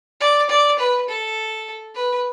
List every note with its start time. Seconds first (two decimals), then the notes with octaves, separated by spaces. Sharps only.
0.20 D5
0.49 D5
0.79 B4
1.09 A4
1.95 B4